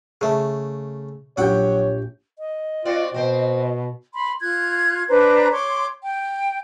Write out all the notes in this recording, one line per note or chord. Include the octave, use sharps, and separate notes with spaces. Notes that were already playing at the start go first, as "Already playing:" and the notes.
C#3 A3 G#4 E5 A5
A#1 F#3 G4 C#5 F#5 G5 G6
D#5
C4 F4 F#4 D5
B2 C4 C5
B5 C6
F4 F#6 G#6
D4 B4 C5 A#5
C#5 C6 D6
G5